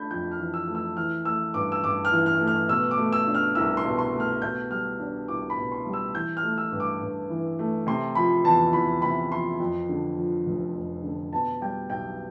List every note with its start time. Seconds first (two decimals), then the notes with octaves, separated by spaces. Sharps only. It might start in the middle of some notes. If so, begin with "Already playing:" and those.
Already playing: A3 D4 B5 G6
0.11 F2 G6
0.31 F6
0.39 E3
0.54 E6
0.67 A3
0.75 E6
0.97 E3 F6
1.25 A3 E6
1.54 G2 D6
1.72 E6
1.83 G2 D6
2.05 F6
2.12 E3
2.26 F6
2.40 A3
2.47 F6
2.69 B2 E6
2.91 D6
2.98 A3
3.13 E6
3.27 D4
3.34 F6
3.55 C2 E6
3.77 C6
3.85 B2
3.99 C6
4.13 A3
4.20 F6
4.42 B2 G6
4.71 G3 F6
5.00 D4
5.28 C2 D6
5.50 B5
5.57 B2
5.72 C6
5.86 G3
5.93 E6
6.15 E3 G6
6.37 F6
6.43 A3
6.58 E6
6.72 G2
6.80 D6
7.01 G2
7.30 E3
7.59 A3
7.87 C3 C6
8.15 F3 B5
8.44 E2 A5
8.73 E2 B5
9.02 C3 B5
9.31 F3 C6
9.60 F2
9.89 D3
10.17 F3
10.46 F1
10.75 F2
11.04 D3
11.33 B2 A5
11.61 G3 G5
11.90 B1 G5